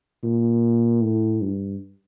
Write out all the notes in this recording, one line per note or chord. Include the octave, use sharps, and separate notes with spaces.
A#2
A2
G2